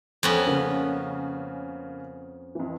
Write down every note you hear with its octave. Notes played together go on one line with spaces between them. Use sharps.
F2 B3 C#4
C#3 A#3
F2 E3